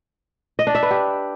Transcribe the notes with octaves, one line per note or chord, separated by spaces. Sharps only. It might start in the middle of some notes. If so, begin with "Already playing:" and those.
D#5
D4
E5
B4
G4